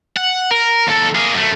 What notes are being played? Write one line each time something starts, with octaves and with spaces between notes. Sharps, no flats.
F#5
A#4
D#2 A4
A#3 G#4
F#2 A3